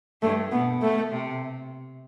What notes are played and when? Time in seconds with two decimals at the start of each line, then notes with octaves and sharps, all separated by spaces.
0.22 G2 A3
0.52 B2 B3
0.82 A3
1.11 C3